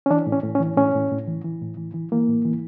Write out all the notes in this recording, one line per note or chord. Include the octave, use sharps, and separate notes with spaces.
C#4
E3 D4
A2
C#4
A2
C#4
E3
A2 C#4
A2
A2
E3
E3
A2
E3
E3
E3 A#3
A2
E3